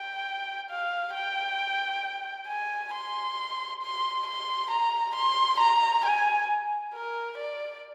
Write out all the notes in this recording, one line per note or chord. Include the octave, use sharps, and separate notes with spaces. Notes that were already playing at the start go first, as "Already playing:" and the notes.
Already playing: G5
F5
G5
G#5
C6
C6
C6
A#5
C6
A#5
G#5
A#4
D5